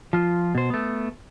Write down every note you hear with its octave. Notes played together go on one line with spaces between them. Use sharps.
F3 F4
B2 C5
A3 B3